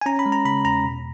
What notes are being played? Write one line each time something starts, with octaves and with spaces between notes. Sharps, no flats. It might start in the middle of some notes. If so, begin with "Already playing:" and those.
G#5
C#4 A#5
B5
G#3
A#5
C#3 B5
E2 A#5
B2